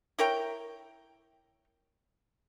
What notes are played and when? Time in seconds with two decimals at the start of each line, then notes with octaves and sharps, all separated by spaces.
0.19 E4 A#4 C#5 G5